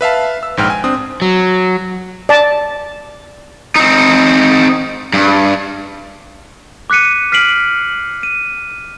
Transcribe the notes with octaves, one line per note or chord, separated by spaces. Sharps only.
B4 E5 F5 A5
E6
A#1 G#2 G5 F6
G#5
C4 D4 D#6
F#3
D5 A5
C4 D#4
G2
D6 F#6 B6 C#7 D#7
F6 B6 C7 D7 F#7
D#7